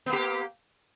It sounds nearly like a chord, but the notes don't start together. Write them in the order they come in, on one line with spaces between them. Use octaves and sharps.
B3 A#3 G4